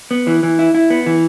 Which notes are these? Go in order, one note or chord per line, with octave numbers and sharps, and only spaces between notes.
B3
E3
E3
E4
E4
B3
E3